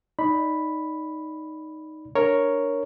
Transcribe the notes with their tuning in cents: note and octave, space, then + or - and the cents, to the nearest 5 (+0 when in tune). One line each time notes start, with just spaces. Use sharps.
D#4 +0 D5 -20 B5 +0
D4 +0 A#4 +0 C#5 +0